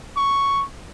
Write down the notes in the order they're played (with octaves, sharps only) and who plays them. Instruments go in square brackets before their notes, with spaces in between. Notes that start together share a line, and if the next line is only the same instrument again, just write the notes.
[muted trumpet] C#6